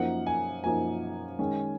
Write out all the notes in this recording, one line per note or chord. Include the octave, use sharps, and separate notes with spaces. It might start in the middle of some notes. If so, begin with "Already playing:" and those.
Already playing: F#2 F3 A#3 D#4 F#5
G#5
F#2 F3 A#3 D#4 G#5
D#3 G#3 C#4